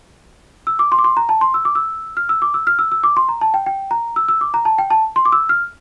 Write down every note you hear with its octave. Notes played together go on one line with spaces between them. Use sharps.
E6
D6
C6
D6
C6
A#5
A5
C6
E6
D6
E6
F6
E6
D6
E6
F6
E6
E6
D6
C6
A#5
A5
G5
G5
A#5
E6
E6
D6
A#5
A5
G5
A5
C6
D6
E6
F6